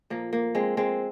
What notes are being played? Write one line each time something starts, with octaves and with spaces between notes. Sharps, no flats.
A#2 F3 A#3
A#3
G#3 C4
G#3 C4